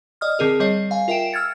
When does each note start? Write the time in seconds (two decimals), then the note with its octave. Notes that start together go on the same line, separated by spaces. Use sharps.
0.21 D5 D#5 D#6 F6
0.39 D3 C4 G#4 A#4
0.60 G3 C#5 D#5 C7
0.91 F5 G#5
1.08 F4 A#4 E5 G5 D7 E7
1.33 E6 F6 G#6 A6 C#7